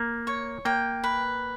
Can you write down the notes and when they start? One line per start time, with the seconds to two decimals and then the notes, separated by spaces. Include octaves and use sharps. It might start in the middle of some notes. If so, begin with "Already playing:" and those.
Already playing: A#3
0.27 C#5
0.65 A#3 G5
1.04 B4